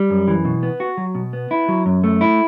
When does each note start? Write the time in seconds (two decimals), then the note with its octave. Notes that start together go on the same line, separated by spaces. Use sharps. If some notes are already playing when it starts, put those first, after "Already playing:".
Already playing: G3
0.10 F#2
0.28 E3
0.45 B2
0.63 B3
0.80 F#4
0.97 F#3
1.15 B2
1.33 B3
1.51 E4
1.68 F#3
1.86 F#2
2.04 A3
2.21 E4